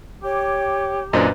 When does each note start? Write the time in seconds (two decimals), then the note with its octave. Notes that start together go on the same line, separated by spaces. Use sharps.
0.23 G4 C#5 G5 D6
1.13 F#2 A#2 D4 B4 C5 D#5 A#5